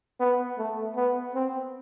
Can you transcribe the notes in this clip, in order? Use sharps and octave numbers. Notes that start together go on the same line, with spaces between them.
B3
A3
B3
C4